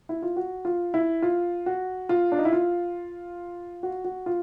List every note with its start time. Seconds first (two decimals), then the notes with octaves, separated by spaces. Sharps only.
0.09 E4
0.22 F4
0.36 F#4
0.65 F4
0.94 E4
1.22 F4
1.66 F#4
2.09 F4
2.32 D4
2.38 D#4
2.45 E4
2.53 F4
3.83 F#4
4.04 F#4
4.26 F4